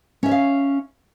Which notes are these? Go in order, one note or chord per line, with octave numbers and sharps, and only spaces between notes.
C#4 C#5 E5 F5